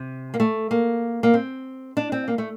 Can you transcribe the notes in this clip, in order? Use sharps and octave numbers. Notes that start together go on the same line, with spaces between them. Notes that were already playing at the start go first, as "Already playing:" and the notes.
Already playing: C3
A#3
A3
A#3
A#3
C4
D4
C4
A#3
A3